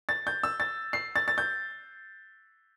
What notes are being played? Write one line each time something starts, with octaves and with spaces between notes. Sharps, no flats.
A6
G6
E6
A6
C7
A6
A6
G6